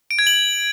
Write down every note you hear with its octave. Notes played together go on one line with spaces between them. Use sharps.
D7
G#6
F#7